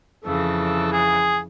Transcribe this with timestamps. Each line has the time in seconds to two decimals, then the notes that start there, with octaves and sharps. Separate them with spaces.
0.25 F2 C#3 E3 A4
0.93 G#4